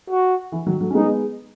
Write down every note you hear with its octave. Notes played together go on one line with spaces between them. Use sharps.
F#4
E3
D#3 F#3
F#3 A3
C#4
G#3 B3 D#4